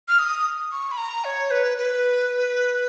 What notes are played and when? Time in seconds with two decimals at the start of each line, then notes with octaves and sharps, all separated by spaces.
0.08 F6
0.19 D#6
0.72 C#6
0.92 B5
0.97 A#5
1.25 C#5
1.51 B4
1.78 B4